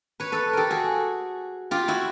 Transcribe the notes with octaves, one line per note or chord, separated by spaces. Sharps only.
B4 C#5
A4 B4
G4 A4 A#4
F#4 G#4
F4 G4
E4 F#4